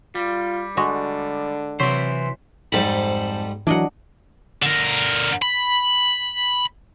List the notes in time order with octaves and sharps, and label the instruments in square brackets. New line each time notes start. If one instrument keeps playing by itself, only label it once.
[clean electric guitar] G3 [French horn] F4
[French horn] D3 [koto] G#3 F#4
[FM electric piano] C3 C6 B6 [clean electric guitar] E3 C5 [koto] F#3
[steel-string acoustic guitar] F2 A4 C5 [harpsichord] G#2 G3 B5
[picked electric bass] E3 F#3 [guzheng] D4 D#5 F#5
[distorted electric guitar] D3 A#4
B5